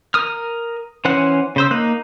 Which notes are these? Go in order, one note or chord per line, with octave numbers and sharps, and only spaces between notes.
A#4 D#6 F6
E3 C#4 C5 F#5 F#6
C#3 C5 E6
A#3 D#4 F#6